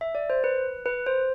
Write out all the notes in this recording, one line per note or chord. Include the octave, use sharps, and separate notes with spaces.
E5
D5
C5
B4
B4
C5